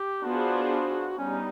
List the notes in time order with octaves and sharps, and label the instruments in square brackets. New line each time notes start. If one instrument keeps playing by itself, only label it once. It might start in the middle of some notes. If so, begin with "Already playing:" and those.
Already playing: [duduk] G4
[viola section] B3 D4 F4 G#4 C5 [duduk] F#4
[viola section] G3 B3 D#4 [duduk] C#4